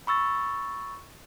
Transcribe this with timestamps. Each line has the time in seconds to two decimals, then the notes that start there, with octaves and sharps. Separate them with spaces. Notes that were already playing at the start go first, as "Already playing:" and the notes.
0.07 B5 C#6 E6 A6